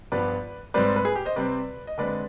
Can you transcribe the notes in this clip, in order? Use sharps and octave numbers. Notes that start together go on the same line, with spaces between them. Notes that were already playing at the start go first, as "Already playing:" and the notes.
G2 F3 B3 B4 D5
G#2 G3 C4 B4 D5
B4
G#4
G4
C5 D#5
C3 G3 C4 B4 D5
D#5
D3 G#3 C4 B4 D5